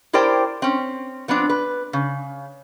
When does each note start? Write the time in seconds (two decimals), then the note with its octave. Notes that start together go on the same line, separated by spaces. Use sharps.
0.13 E4 G4 A#4 C5 D5 G5
0.62 C4 C#4
1.28 F3 B3 C4 D4
1.49 B4
1.93 C#3